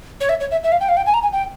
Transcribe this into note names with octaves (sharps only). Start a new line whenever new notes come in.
C#5
E5
C#5
E5
E5
F5
G5
F5
G5
G#5
A#5
G#5
G5